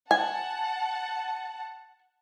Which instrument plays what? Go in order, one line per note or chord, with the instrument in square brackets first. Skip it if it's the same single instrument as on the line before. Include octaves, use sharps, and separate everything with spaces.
[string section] F#5 A5 [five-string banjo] G#5